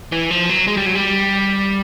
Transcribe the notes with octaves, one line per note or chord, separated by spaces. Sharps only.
E3
F3
F#3
G#3
G3
F#3
G3